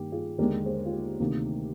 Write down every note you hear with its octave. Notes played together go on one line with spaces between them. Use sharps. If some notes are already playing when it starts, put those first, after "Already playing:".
Already playing: G2 D#3 G3 A#3 G4
F4 G#4
D#2 D3 G#3 G4 A#4
G#4 C5
F4
G4
D2 C3 D#3 A#3